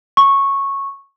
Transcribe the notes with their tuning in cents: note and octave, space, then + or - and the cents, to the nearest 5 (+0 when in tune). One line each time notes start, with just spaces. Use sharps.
C#6 -10